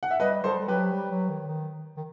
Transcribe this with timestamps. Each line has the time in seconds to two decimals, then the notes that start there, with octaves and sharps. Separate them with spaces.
0.03 F#5
0.11 E5
0.20 G3 B4 D#5
0.44 G3 A4 C5
0.60 G3
0.68 F#3 G4 B4
0.93 G3
1.11 F#3
1.29 D#3
1.48 D#3
1.97 D#3